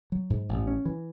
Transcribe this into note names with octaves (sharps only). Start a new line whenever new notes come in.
F#3
G#2
A1
C#4
E3